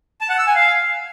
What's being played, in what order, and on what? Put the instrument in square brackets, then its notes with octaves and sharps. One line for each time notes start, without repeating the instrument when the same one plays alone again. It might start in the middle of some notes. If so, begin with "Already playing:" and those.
[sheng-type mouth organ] A5
F#5
E6
G#5
F5